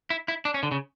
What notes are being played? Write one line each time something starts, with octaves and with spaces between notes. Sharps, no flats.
E4
E4
D4
C#4
D3
C#3